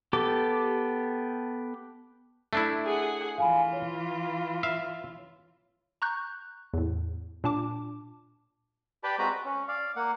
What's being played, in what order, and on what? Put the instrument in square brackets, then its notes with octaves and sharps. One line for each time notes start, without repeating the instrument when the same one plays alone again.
[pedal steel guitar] B3 G4 A4 D6
[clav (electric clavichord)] A3 D4 E4
[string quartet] G#4 F#5
[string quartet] E3 F4 [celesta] F5 G#5 B5
[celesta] C#5
[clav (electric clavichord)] E5 F5
[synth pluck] A#5 C#6 F#6 G6
E2 A2
A#2 D4 A5 D6
[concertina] G4 B4 D5 G5 A5 B5
G#3 C4 F#4 B4 A#5 B5
B4
C#4
D5 F5
A#3 F#5